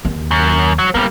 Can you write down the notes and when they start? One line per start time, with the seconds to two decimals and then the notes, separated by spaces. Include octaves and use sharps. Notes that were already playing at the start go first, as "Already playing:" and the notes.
0.05 D#2
0.31 F#2
0.79 F#3
0.95 G3 A#3 B3